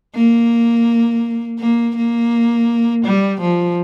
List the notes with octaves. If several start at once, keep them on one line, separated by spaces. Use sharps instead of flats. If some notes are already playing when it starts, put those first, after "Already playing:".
A#3
A#3
A#3
G3
F3